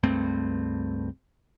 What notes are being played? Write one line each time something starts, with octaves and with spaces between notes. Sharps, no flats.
C#2 G2 A3 C4